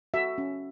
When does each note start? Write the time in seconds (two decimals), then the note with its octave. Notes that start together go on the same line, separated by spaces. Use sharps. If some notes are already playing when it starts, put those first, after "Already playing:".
0.14 F#4 E5
0.38 C#4